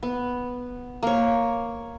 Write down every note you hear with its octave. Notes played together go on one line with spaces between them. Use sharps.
B3
A#3 C#5